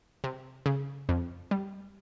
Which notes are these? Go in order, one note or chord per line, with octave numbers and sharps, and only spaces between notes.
C3
C#3
F2
G3